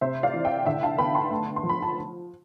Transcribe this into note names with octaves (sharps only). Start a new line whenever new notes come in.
C3 C5 E5
D5 F5
E3
E5 G5
D3 E5 G5
F5 A5
B3 G5 B5
A5 C6
A3
C6
F3
B5
A5